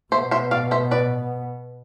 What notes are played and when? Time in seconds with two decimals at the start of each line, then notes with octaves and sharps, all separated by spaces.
0.12 B2 C5 E5
0.15 B3
0.31 C5 E5
0.51 D5 F5
0.71 C5 E5
0.91 B4 D5